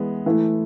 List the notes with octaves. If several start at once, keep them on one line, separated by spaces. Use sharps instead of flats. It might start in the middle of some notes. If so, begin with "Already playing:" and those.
Already playing: E3 G#3 B3
E3 A3 E4